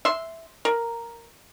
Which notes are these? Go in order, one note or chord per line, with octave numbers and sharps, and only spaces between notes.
E5 C6
A#4